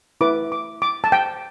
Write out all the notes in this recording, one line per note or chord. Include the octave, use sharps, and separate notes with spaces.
E4 B4 D6
D6
D6
A5
G5